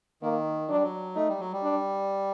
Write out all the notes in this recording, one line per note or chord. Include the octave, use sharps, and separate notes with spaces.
D#3 A#3
F#3 D4
G3
F#3
A3 D#4
G3
F#3
G3
D4